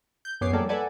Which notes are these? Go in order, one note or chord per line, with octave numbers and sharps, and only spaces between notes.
G6
F#2 B3 G#4 C#5 D6 C7
F3 G3 A#3 A4 C#5 D5
A4 B4 D5 F#5 G#5